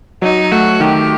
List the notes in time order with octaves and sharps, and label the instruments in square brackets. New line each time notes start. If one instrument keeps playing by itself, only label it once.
[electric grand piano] F#3 [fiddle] D#4
[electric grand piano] A3 [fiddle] F#4
[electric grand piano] D#3 [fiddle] G4